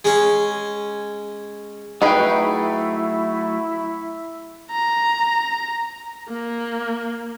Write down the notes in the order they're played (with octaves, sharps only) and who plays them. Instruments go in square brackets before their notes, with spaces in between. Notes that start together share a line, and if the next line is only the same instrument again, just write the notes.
[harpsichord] G#3 C#4
[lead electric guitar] F#3 A3 [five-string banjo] D#4 B4 [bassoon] E4 [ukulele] G#4 G5
[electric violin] A#5
A#3